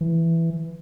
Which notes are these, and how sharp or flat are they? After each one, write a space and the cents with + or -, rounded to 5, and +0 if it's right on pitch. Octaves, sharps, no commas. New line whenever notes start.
E3 +5